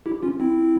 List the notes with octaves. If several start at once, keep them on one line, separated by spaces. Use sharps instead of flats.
E4 G4
C#4 F4
C4 E4